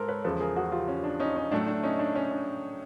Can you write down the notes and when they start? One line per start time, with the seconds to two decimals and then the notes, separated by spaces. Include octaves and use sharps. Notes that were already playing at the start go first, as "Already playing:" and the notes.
Already playing: G#2 A4 A#4 C5
0.08 B4 C#5
0.24 E2 C#3 F3 G#3 A4 B4
0.40 G#4 A#4
0.56 F#4 G#4
0.72 F4 G4
0.88 C#4
1.04 D4
1.20 C#4 D#4
1.36 C#4
1.51 A2 F#3 A3 D4
1.67 D4
1.83 C#4 D#4
1.99 D4
2.15 C#4
2.31 D4